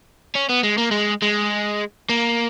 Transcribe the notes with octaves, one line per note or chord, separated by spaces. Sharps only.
C#4
B3
G#3
A#3
G#3
G#3
A#3